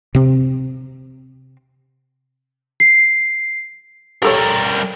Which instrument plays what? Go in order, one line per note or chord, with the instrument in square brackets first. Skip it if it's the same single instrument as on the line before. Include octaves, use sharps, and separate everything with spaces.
[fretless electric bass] C3 C4
[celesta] C7
[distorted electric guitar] G3 A#4 [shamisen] G4 A4 C#5